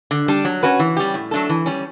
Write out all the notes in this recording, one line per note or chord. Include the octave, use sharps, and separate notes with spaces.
D3
G3 D4
F#3
C#4 F#4 B4
E3
G3 C#4 G4
A2
F#3 A3 D4 A4
E3
G3 C#4